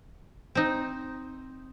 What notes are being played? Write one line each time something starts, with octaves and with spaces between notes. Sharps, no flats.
C4 D#4